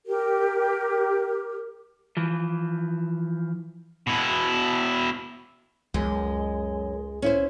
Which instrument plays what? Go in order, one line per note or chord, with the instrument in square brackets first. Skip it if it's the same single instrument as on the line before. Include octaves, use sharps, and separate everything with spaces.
[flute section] G4 A#4
[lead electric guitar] E3 F3
[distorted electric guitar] B2 E4
[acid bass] C#2 [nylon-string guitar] F#2 [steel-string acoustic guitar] G#3
[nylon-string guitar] C#4 E4 C5